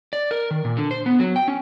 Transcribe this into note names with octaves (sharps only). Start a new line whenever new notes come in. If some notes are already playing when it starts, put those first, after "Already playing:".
D5
A#4
D#3
A#2
D3
C5
B3
F#3
G5
C#4